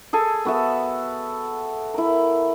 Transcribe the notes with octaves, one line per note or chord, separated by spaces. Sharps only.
G#4 A4 G#5
B3 F#4 A4 E5
E4 A#4